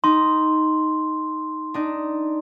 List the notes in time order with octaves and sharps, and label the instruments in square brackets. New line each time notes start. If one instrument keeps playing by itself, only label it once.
[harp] D#4 [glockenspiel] C6
[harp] D4 D#4